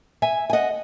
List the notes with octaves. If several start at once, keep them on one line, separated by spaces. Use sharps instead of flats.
E5 G#5
G#5
D#5 F#5